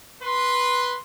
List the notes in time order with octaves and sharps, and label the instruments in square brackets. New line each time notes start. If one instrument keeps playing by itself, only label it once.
[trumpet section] B4 C6